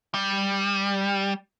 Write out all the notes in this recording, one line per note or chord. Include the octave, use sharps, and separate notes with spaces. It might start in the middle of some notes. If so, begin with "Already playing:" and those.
G3